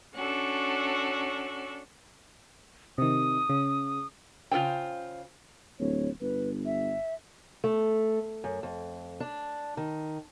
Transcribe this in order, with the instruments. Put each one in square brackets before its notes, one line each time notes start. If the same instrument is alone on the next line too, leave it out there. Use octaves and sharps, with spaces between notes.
[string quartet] C#4 D4 F#4 A4
[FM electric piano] C3 D#3 [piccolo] D#6
[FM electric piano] C#3
[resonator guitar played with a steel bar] C#3 F4 A4 C5 G5
[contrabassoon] D1 [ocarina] C#5
[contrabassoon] G1 [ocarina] B4
[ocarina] E5
[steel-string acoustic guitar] A3
F#2
F2
D4
D#3